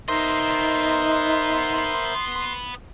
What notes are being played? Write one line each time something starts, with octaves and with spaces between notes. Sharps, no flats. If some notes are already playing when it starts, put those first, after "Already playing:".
B3 D#4 A#4 C5 D#5 E5 C6